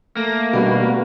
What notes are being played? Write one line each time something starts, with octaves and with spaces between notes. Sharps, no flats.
A3 A#3 A#6
B2 G3 B3 F#4